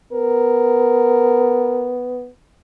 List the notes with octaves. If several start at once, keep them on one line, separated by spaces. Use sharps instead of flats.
B3 A#4